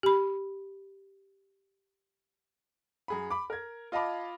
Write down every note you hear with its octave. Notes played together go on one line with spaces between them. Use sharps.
G4 B5
F#2 G#4 B5
B5 D6
A#4 G#6
F4 D#5 F5 A5 B5 D6